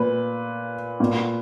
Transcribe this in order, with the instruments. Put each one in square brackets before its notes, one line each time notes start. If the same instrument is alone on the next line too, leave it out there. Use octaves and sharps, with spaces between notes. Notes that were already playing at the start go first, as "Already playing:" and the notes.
Already playing: [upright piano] A#2 B4
A#2